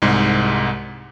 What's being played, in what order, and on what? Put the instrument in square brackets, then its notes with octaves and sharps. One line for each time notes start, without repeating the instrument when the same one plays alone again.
[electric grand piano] C2 G#2 G#3